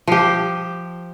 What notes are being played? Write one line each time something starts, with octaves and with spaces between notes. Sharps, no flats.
F3 G4